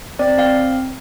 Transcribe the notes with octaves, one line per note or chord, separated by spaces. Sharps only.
C4 D5
C4 F5